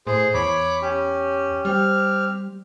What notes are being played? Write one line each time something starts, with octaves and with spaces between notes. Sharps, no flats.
A2 G#4 C5
E2 C#5 B5 D6
C#4 G4
G3 C4 G4 F6